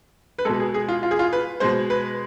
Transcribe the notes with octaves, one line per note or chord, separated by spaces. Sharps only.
B4
B2 G#3 A4
G#4
G#4
F4
F4
G#4
F4
B4
B2 G#3 C5
B4